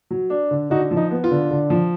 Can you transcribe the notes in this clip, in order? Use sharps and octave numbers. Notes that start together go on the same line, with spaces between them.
F#3
D4
D3
D3 D#4 F#4
F3
D#4
B3
F4
D3
D3
F3